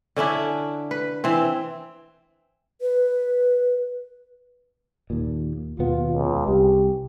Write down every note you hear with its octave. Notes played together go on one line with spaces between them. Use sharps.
D3 C#4 D4 E4
B4
E3 C4
B4
D#2 A#2
D#2 B2 B3 F4
C#2
C2 G4